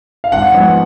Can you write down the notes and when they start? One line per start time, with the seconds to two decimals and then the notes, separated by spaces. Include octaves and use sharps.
0.24 F5
0.32 G#1 F#5
0.54 G#2 F3 G#3 B3